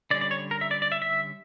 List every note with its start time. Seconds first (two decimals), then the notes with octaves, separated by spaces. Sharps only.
0.11 D3 G3 C#4 D5
0.21 D5
0.31 C#5
0.51 A#4
0.61 E5
0.71 D5
0.82 D5
0.92 E5
1.02 E5